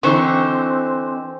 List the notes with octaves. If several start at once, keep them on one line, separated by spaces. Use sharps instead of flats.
D3 E3 C4 D#4 C5 C#6